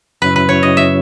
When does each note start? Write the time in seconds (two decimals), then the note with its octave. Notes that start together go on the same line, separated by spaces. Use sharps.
0.22 F#2 C#3 F#3 C#4 E4 B4
0.36 B4
0.49 C#5
0.63 D#5
0.77 E5